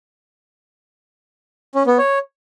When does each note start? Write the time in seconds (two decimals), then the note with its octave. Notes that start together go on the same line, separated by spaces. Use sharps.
1.75 C#4
1.87 B3
1.98 C#5